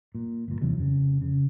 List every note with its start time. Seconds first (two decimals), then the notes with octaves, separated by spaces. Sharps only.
0.15 A#2
0.48 G1 A#2
0.61 D#2 C3 E3 F#3
0.78 F2 C#3
1.21 C#3